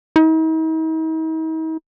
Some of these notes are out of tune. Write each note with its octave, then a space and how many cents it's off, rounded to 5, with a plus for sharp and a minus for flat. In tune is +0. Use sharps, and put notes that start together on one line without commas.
D#4 +45